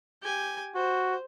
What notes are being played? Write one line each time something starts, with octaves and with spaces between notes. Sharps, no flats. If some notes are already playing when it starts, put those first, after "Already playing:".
G4 G#5
F#4 C5